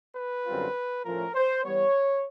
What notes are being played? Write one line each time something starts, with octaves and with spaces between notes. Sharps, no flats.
B4
F#2 D3 G3 C4 F4
A2 F3 A3 C#4 F4 A#4
C5
E3 G3 B3 C#5